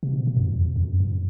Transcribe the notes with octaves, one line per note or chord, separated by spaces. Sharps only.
C3
B2
B2
F#2
F2
E2
F2
F2
F#2
F#2